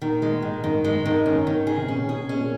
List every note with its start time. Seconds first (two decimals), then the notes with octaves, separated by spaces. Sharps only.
0.02 A#2 D#3
0.22 A#2 G#3
0.42 G#2 D#3
0.64 F#2 D#3
0.71 G#2
0.79 F#2
0.84 G#2 G#3
0.93 F#2
1.01 G#2
1.06 F#2 D#3
1.26 G#2 C#4
1.47 D#3
1.67 G#4
1.78 C3
1.88 A#2 C#4
2.09 G#4
2.29 C#4
2.41 A#2